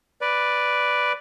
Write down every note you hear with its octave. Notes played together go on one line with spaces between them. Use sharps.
B4 D5